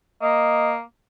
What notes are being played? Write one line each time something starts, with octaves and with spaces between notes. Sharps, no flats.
A#3 D#5